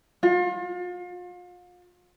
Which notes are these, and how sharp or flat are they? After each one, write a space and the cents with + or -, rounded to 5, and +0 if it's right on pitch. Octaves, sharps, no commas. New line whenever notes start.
F4 +35